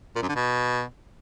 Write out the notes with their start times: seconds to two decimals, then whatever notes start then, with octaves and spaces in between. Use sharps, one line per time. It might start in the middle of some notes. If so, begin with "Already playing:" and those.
0.16 A#2
0.22 F#2
0.29 D3
0.35 B2